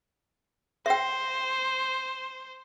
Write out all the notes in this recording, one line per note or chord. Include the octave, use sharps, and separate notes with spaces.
C5 E5 G5